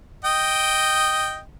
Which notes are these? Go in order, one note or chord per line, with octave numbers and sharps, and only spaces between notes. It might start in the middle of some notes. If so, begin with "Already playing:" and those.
D#5 G5